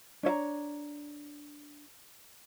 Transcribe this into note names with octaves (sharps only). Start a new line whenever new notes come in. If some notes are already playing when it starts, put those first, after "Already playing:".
D4 C#5 E5 A#5